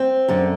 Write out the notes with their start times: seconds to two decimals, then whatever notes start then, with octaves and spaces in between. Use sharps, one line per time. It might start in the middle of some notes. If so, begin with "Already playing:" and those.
Already playing: C4
0.28 F#2 D3